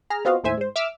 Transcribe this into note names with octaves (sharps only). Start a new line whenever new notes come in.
G#4 A#5 F6
B3 C4 F4 F#4 D#5 F5
D#2 A2 C5 E5 G#5
G#2 C5
E5 D6 E6 F6